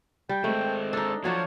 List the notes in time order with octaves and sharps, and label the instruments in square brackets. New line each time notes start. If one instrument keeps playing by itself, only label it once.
[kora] G3 [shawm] G5
[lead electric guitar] G#3 C4 [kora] A3
[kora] D4 D#4 [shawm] A4
[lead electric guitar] F3 [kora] F#3 D4 F#4 [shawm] C#5